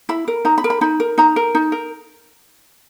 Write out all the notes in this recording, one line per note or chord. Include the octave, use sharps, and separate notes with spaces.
E4 B5
A#4
D#4 A#5
B5
A#4
B5
D#4 B5
A#4
D#4 A#5
A#4
D#4
A#4